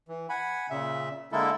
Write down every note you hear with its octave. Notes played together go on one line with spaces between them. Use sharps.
E3
F#5 G#5 B5
A#2 C#3 E5
D3 G#3 A#3 E4 A4